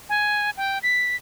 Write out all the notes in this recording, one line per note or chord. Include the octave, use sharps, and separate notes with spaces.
G#5
G5
B6